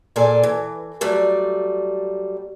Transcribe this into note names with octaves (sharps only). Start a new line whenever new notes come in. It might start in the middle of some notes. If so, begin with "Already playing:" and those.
A#2 G#4 A4 D5 G#5
E3
F#3 G3 A3 D5